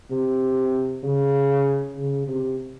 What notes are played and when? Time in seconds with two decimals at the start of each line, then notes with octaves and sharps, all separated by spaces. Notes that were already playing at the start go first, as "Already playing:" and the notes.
0.10 C3
1.03 C#3
1.96 C#3
2.27 C3